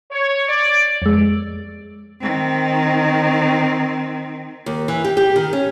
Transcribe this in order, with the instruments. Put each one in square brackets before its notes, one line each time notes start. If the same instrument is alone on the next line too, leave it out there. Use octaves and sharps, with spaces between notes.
[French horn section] C#5
D5
[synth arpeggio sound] F2 G#3
[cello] D#3 C4
[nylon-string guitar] D#2
E3
G4
G4
D#3
C#4